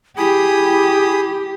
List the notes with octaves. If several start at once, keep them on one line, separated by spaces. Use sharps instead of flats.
E4 G4 G#4 B5 D#6